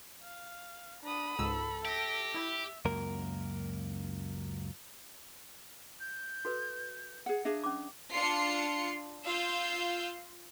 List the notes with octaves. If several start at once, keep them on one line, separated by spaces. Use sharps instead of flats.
F5
D4 B5 D#6
C#2 G#2 A4 E6
G4 E5 A#6
E4 E5
C#2 F#2 A#3 A#4
G6
F#4 A4 B4
G#4 F#5
D4 G#4 E5 F5
C#4 D6
D4 F4 C6 C7 C#7
F4 F5 E6 G6